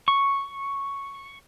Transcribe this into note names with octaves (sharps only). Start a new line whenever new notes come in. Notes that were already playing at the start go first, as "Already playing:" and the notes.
C#6